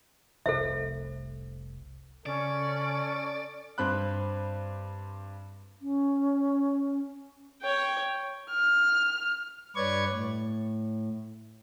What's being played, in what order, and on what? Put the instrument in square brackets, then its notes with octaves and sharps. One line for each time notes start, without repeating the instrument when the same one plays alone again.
[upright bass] F1 C2 [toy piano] A4 C5 E5
[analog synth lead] C#3 [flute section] C#4 [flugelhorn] A4 [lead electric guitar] D5
[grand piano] G2 C4 C5 B5 F#6
[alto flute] C#4
[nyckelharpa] C#5 G5
[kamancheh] F6
[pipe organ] G2 B4 C#5 D5 C#6 G#6
A2